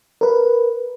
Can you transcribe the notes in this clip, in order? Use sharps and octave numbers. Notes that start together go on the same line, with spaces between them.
A#4 B4